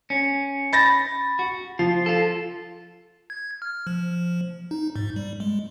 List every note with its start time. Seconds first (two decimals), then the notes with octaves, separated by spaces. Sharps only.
0.10 C#4
0.73 B5 A6 A#6
1.39 F#4
1.79 F3 F4
2.06 F4 A4
3.30 G#6
3.62 F6
3.87 F3
4.71 D#4
4.96 G#2
5.16 G3
5.40 G#3